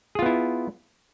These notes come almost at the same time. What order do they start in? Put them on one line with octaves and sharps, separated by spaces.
G#4 F4 B3 E4